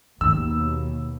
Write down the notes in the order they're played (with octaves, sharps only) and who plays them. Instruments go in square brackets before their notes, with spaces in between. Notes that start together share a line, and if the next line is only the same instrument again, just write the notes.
[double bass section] D#2 B2 [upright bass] D#3 [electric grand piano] E6